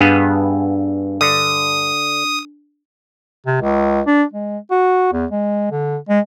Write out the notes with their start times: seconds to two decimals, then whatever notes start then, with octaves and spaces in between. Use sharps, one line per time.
0.01 G2 B3 D4 G#4 F5
1.21 D3 D#6
3.46 C3
3.61 C#2
4.06 D4
4.33 G#3
4.71 F#4
5.12 E2
5.31 G#3
5.71 D3
6.09 G#3